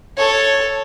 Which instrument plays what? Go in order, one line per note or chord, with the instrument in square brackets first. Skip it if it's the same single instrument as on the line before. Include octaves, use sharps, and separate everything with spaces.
[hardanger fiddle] A4 C#5